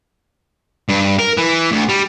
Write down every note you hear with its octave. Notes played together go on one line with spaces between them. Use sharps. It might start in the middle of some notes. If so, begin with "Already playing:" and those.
G2
A#4
E3
D2
G3